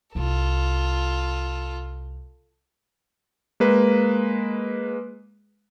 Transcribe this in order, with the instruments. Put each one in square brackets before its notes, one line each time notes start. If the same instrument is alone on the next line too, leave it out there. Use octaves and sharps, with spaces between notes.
[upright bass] C2 [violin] F4 A4
[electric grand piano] G#3 A#3 B4